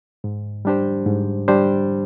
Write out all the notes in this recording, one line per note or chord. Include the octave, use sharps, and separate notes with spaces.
G#2
G3 D4 G4 C5
G#2
G3 D4 G4 C5